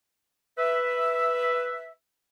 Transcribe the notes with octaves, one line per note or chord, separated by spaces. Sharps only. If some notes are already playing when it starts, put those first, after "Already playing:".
B4 E5